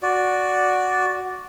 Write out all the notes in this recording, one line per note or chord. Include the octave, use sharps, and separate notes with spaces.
F#4 D5